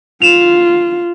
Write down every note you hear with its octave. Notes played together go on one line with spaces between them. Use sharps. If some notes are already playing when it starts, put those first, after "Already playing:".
F4 E7 F7